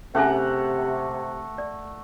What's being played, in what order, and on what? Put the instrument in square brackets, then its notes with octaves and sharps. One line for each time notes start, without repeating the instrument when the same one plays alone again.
[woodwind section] C3 [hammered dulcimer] A3 F#5 A#5 [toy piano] C#4 G#4 G#5
[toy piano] D5